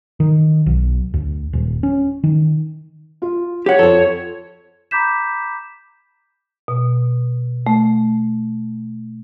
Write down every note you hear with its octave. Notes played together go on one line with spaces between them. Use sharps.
D#3
B1
D2
D#1
C#4
D#3
F4
G4 C#5 F#5
F2 A4 C5
A#5 B5 D6 G6 B6 E7
B2
A3